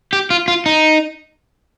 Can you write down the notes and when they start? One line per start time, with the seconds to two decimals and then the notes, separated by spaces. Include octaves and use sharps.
0.13 G4
0.30 F4
0.48 F4
0.66 D#4